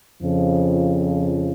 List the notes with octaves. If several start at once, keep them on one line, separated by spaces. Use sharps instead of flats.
F2 C#3 F3